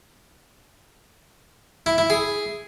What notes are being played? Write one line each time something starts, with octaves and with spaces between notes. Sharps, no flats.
E4
E4
G#4